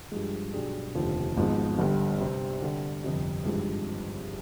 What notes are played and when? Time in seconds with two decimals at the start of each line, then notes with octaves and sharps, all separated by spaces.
0.12 G2 F3 G#3
0.53 B1 B2 G3 D4 G#4
0.94 F1 D#2 D3 F3
1.37 G#1 G#2 F3 G#3 B3
1.79 G1 G2 D3 G3
2.20 C3 G3 C4
2.62 D3 G3 D4
3.04 G1 F2 C3
3.45 G#1 G2 F3 G#3